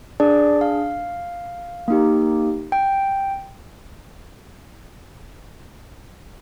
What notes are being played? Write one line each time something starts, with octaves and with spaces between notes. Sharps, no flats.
D4 G#4 D5
F5
A#3 D#4 G4
G5